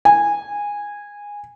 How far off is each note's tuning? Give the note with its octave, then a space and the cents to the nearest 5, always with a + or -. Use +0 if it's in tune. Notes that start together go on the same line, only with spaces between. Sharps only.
G#5 -15